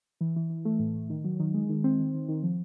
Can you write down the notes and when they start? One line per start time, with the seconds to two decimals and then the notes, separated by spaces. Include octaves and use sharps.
0.21 E3
0.36 E3
0.50 E3
0.65 A3
0.80 A2
0.94 A2
1.10 D#3
1.24 F#3
1.40 D#3
1.54 G#3
1.69 D#3
1.84 C4
2.00 D#3
2.14 D#3
2.29 D#3
2.43 F3